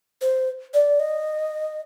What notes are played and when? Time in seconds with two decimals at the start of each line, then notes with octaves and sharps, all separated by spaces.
0.22 C5
0.74 D5
1.00 D#5